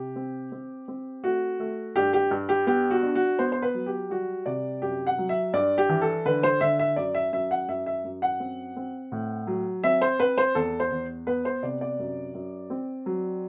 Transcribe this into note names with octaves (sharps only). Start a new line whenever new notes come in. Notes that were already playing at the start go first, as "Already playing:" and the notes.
Already playing: C3 G4
C4
C4
C4
A3 F#4
A3
G2 G4
G4
G2
G4
B3 G4
F#4
D4
F#4
B3 C5
C5
B4
F#3
G4
G3 F#4
C3 D5
F#2 G4
F#5
F#3
E5
G2 D5
G4
E3
A4
D3 B4
C5
D3 E5
E5
F#2 D5
E5
F#2 E5
F#5
F#2 E5
E5
F#2
F#5
C4
C4
A2
F#3
C4 E5
C5
C4 B4
C5
E2 A4
C5
E2
B3 B4
C5
C3 D5
D5
F#2
F#2
C4
F#3